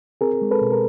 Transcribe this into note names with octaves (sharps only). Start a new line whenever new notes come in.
C4 G#4 A#4
G#3
A4 B4
B2
A#4